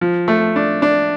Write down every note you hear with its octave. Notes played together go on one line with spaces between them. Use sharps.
F3
A3
D4
D4